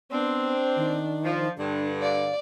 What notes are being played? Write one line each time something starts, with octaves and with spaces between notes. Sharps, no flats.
B3 C4 D4
D#3
F3
G2 D3 D4
D5 F5